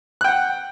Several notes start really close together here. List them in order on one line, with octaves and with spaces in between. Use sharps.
F#6 G5 F#5